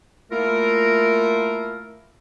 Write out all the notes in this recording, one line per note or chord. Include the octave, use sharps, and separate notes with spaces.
A3 A#3 E4 F4 A#4